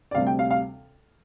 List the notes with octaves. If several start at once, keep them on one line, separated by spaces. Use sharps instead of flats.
D5
D2 C3 G3 C4 F5
G5
F5
F5